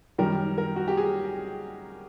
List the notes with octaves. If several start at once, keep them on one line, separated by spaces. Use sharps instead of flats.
F#2 D#3 G3 A#4
A#4
F#4
G4
G#4